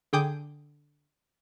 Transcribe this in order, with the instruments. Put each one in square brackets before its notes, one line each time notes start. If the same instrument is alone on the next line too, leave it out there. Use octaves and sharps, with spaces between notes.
[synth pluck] D3 G#4 G5 D6 D#6 G6